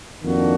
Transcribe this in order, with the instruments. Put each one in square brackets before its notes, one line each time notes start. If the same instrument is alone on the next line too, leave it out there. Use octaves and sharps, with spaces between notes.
[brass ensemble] F2 D#3 A#3 D4 F#4